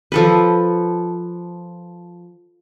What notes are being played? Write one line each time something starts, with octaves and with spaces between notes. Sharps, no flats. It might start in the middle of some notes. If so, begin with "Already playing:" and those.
F3 A4 B4